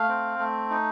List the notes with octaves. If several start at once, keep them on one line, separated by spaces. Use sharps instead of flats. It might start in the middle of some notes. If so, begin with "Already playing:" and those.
Already playing: A3 F5
C4
A3
D#4